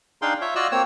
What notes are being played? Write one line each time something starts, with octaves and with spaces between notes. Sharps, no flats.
D4 D#4 G#4 F5 G5 C6
F4 C#5 E5
F4 F#4 D5 D#5 E6
A#3 C4 C#5 E6